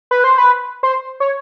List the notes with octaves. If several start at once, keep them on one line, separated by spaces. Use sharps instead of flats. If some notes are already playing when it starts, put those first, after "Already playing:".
B4
C5
B4
C5
C#5